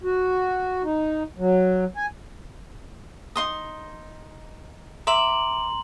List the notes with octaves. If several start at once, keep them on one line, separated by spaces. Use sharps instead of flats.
F#4
D#4
F#3
G#5
D#4 C6 D#6
E5 A#5 C6 D6 F#7